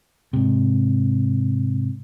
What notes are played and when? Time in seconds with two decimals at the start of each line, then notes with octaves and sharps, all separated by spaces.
0.33 G#2 C3